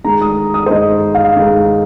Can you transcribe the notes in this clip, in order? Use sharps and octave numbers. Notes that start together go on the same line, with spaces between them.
D#3 G#3 A#5
D#6
D#6
C5
D#3 G#3 D#5
F5
D#3 G#3